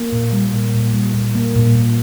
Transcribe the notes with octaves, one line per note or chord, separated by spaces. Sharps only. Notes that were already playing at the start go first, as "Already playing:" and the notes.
Already playing: A#3
A#2
G3
A#2
A#2
G3
A#2
A#3
A#2
A#2